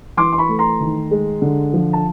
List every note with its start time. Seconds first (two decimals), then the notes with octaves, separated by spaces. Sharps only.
0.17 E3 C6 D6
0.32 C6
0.38 B5 C#6
0.49 A3
0.59 A#5 C6
0.80 D#3
1.11 G#3
1.42 D3
1.73 F3
1.93 A5